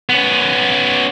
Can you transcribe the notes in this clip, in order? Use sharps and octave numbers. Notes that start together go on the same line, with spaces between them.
B3 C#4